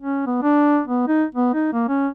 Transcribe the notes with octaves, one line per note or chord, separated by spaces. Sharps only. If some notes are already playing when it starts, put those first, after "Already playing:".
C#4
B3
D4
B3
D#4
B3
D#4
A#3
C#4